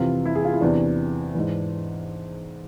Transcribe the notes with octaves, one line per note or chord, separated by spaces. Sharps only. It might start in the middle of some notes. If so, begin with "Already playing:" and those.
Already playing: F2 C3 E3 F4
E4
G#4
F4
E4
E2 C3 E3 D4
G#2 E3